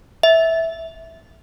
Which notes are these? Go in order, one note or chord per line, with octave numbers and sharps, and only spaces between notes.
E5